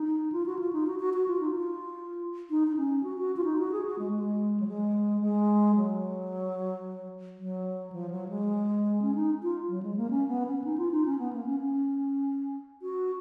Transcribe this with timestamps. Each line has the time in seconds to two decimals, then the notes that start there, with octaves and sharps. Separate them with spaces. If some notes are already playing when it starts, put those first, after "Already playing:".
Already playing: D#4
0.32 F4
0.46 F#4
0.59 F4
0.73 D#4
0.87 F#4
1.00 F#4
1.14 F#4
1.28 F4
1.40 D#4
1.52 F4
2.50 D#4
2.67 D#4
2.77 C#4
3.03 F#4
3.18 F#4
3.37 F4
3.44 D#4
3.59 F#4
3.72 G#4
3.85 F#4
3.99 G#3
4.13 G#3
4.60 F#3
4.68 G#3
5.21 G#3
5.76 F#3
7.39 F#3
7.92 F3
8.10 F#3
8.29 G#3
9.02 C#4
9.15 D#4
9.43 F4
9.69 F#3
9.83 G#3
9.97 A#3
10.11 C#4
10.28 B3
10.47 C#4
10.64 D#4
10.78 F4
10.91 D#4
11.06 C#4
11.19 B3
11.33 A#3
11.46 C#4
11.60 C#4
12.82 F#4